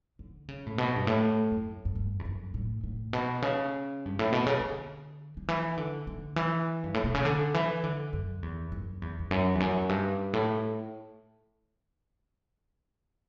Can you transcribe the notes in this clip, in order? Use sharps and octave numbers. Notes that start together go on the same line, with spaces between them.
D3
C#3
A2
B2
G2
A2
F#2
F#2
G2
E2
F#2
A2
A2
B2
C#3
G2
A2
B2
C#3
D3
D3
E3
D3
D3
E3
G2
A2
B2
C#3
D3
E3
D3
F#2
E2
F#2
E2
E2
F#2
E2
F#2
G2
A2